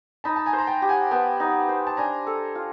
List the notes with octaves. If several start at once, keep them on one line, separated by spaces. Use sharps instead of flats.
D#4 A5 B5
A5
G#5 A#5
C5
A#5
G5 A5
G4
F#5 G#5
B3 G5 A5
D#4
C5
A5
D4 G#5 A#5
A4
F4